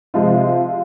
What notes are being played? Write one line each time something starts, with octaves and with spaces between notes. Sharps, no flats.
C3 F3 G#3 F4